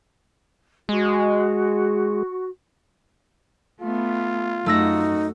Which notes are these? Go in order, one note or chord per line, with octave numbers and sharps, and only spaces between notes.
G#3 F#4
A3 B3 F4
F#2 A3 D#4 F#4 E6 A#6